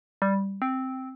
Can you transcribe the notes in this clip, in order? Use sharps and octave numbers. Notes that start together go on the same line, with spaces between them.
G3
C4